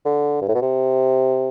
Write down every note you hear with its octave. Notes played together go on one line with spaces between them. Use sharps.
D3
G2
A2
B2
C3